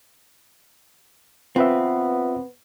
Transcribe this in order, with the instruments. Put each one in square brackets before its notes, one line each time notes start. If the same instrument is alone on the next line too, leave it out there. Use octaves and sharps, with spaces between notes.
[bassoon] B3 [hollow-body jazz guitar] C4 [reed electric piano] F4 B4 E5